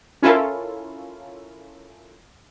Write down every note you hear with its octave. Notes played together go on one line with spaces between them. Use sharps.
C#4 E4 F4 A4 A#4